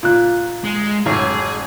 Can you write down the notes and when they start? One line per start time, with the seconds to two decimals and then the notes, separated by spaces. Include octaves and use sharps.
0.03 A#2 F#6
0.64 G#3
1.06 A1 F#2 G#4